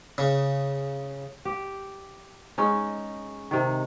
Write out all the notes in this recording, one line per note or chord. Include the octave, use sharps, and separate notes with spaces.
C#3
G4
G#3 C#4 D#4
C3 D#3